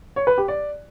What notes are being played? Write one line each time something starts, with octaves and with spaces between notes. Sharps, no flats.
C#5
B4
G4
D5